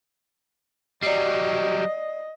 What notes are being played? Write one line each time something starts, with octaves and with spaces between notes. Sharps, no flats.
F#3 G3 D5 D#5 C7